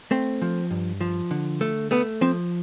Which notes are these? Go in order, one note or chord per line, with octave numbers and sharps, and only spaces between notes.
A3 C4
F3
G2
F3
D3
A3
A3 B3
F3 C4